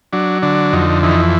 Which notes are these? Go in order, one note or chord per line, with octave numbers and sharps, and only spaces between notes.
F#3 D4
D3 D4
F2 D#4
E3 D#4